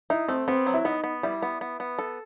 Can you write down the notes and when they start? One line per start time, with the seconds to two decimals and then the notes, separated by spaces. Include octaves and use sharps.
0.10 D#4 E4
0.28 A3 C4
0.48 B3 C4
0.67 F#3
0.74 E4
0.85 B3 D#4
1.04 B3
1.23 G3 E4
1.42 B3
1.61 B3
1.80 B3
1.99 A4